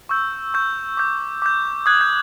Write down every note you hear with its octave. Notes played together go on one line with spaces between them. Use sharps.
C#6 E6 G6
C#6 E6 G6
D6 G6
D6 G6
D#6 F#6 G#6
G6